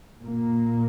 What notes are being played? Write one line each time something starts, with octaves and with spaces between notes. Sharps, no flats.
A#2 A#3